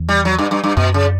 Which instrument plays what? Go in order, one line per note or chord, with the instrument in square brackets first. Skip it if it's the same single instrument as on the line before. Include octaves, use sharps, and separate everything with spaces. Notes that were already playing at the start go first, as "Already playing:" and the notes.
Already playing: [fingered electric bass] E2
[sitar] G3
F#3
G2
G2
G2
[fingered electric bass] F#2 [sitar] B2
[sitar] C#3